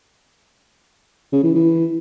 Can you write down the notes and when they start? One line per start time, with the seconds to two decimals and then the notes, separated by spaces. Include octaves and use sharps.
1.32 C#3
1.44 E3
1.55 E3